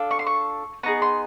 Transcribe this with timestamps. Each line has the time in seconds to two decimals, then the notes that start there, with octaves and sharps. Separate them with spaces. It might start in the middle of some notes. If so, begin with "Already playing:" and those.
Already playing: D4 F4 A4
0.11 C#6
0.19 C6
0.26 C#6
0.83 B3 D#4 G#4 C#6
1.02 C6